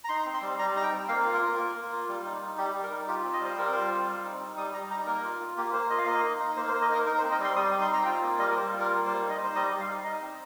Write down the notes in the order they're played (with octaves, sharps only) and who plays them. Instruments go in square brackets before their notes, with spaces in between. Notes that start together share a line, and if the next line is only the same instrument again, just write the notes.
[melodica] A#5
D#4 C6
C4
C6
G3
G3 A#5
D#4 A#5
G5
C4
A#3 F5
F4
A#4
F4
A#3
A#3
F4
G3
D#4
D#4
G3 G4
G3
A#4
D#4
F4 G4
C4
D#5
G3 C5
G3 A#4
F4 C5
C4
G3
D#4
D#4
G3 D#6
G3 A#5
D#4 A#5
A#3 A#4
F4
F4
A#3 G4
A#3 C5
F4 D#5
F5
A#3 D#5
D#4
D#4
A#3 C5
C5
A#3
D#5
D#4 A#4
D#4 A#4
C5
C4
D#5
G3
C6
G3 D#6
D#6
D#4
C6
C4 A#5
F4 G5
A#3
G3 D#5
A#4
G3 C5
F4
A#4
A#3
G3 C5
D#4
D#5
D#4
C5
G3 D#5
G3
F5
D#4
D#4 D#5
C4